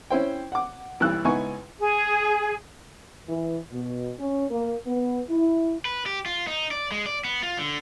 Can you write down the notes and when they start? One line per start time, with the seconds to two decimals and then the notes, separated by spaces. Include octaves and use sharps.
0.10 C#4 E4 C5 G5
0.52 F#5 D6
1.00 B1 E3 G3 E6 F#6
1.24 C#2 B3 D#4 E4 G#5 C#6
1.79 G#4
3.29 E3
3.71 B2
4.19 C#4
4.50 A#3
4.86 B3
5.30 E4
5.85 B4
6.06 G4
6.26 F4
6.47 D#4
6.71 D5
6.92 G#3
7.06 D5
7.25 B3
7.43 F4
7.57 D3